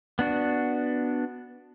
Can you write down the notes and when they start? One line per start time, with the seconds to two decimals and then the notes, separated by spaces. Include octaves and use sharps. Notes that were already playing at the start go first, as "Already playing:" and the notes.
0.19 B3 D4 F#4